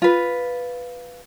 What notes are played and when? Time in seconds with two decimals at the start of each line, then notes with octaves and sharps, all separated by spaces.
0.02 F4 B4